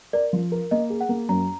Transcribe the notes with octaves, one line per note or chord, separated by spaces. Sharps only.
A#4 D5
F3
A#4
A#3 D#5
G#4
F#5
A#3
F#2 A#5